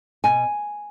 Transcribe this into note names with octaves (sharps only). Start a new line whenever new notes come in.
B2 G#5